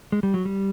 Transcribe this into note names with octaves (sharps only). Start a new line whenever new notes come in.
G#3
G3
F#3
G3